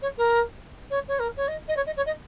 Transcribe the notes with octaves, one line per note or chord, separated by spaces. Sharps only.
C#5
A#4
C#5
C#5
A#4
C#5
D#5
D#5
C#5
D#5
C#5
D#5